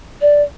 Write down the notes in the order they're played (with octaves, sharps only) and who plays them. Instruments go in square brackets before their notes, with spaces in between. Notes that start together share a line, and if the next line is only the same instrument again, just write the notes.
[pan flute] D5